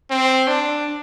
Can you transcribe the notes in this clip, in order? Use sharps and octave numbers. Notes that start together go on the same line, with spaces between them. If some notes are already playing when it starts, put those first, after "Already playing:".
C4
D4